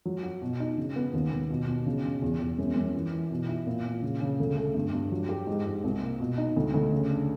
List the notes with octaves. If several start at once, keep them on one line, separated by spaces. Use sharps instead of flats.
F#3
F#4
B2
D#4
C#3
B3
D#2
D#2
B2
B2
C#3
C#3
E2
E2
F#2
F#2
E3
E3
B2
E4
A#2
A#2
C#3
C#3
D2
A3
G2
G2
F#3
G4
G#2
G#2
C2
A#3
B2
D#4
D2
D2
C#3
D4